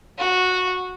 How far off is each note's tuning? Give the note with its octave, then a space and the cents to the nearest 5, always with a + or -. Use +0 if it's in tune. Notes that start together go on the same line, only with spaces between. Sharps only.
F#4 -10